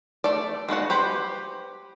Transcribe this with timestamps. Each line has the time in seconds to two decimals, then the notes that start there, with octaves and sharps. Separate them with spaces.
0.24 A3 D5
0.69 G#3 B3 F#4 F#5
0.90 G4 B4 C5